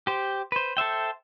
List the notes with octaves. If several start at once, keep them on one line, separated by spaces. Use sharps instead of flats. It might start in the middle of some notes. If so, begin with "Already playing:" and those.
G4 C5
B4 C5
A4 C5 E5 G5